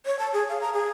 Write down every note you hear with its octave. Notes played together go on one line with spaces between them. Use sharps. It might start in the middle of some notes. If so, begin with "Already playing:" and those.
C#5
A5
G#4
F5
A#5
G#4